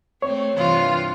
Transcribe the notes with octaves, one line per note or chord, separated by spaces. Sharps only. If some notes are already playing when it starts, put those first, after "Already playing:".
A3 C4 C#5
G2 C3 E3 F4